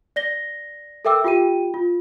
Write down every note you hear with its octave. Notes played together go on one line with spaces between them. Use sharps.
D5 A#6 G7
A4 A#4 E5 G5 D6 E6
F4 G4 G5 D#7
F4